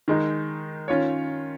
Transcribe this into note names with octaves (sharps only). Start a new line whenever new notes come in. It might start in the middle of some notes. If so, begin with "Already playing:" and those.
D#3 G#3 D#4
D#3 C#4 F4 C#5